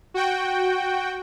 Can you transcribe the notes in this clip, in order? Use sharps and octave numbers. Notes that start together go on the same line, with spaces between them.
F#4 G5